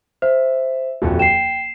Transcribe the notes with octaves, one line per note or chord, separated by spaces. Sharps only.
C5 E5
D#1 F2 F#4
G5 C7 E7